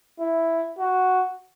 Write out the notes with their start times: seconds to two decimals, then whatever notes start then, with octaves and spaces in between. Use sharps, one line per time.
0.20 E4
0.79 F#4